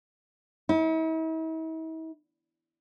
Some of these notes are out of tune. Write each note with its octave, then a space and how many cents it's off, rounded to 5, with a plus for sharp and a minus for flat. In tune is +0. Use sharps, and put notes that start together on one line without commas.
E4 -45